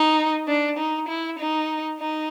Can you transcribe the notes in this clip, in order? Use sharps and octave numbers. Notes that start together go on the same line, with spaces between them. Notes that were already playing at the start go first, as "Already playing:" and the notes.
Already playing: D#4
D4
D#4
E4
D#4
D#4